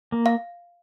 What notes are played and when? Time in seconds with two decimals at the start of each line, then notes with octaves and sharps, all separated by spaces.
0.12 A#3
0.26 F5